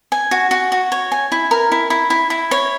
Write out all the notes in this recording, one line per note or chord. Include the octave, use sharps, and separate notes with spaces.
G#5
F#4
F#4
F#4
C#5
G#5
E4
A#4
E4
E4
E4
E4
C#5